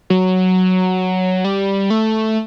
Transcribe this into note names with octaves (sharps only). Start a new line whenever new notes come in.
F#3
G3
A3